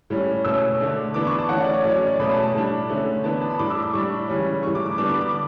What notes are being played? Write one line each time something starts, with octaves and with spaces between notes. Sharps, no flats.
A2 G3 C#4
B2 A3 C#4 E6
D3 A3 D4
E3 B3 D4 D6
C#6
A5
E3 A3 C#4 F#5
D5
C#5
A2 F#3 C#4 D5
C#5
D5
B2 A3 C#4 B5
A5
A5
A2 G3 D4
D3 A3 C#4
E3 B3 D4 A5
A5
B5
A2 G3 D4 D6
E6
D6
A2 G3 D4 C#6
C#3 E3 G3 C#4
A2 E3 G3 C#6
D6
D6
D3 G3 B3 D4 D6
D6
D6